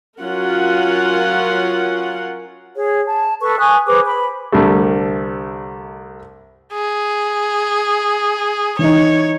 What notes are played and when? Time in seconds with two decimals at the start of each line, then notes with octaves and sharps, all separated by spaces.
0.21 F#3 C#4 F4 A#4 F#5
2.76 G#4 C#5
3.08 A5
3.41 A4 B4 C#6
3.59 G#5 C#6 D#6 F#6
3.86 G#4 B4 C5 D6
4.06 B5
4.52 C2 D3 G3 A3
6.73 G#4
8.79 E3 D#4 C#5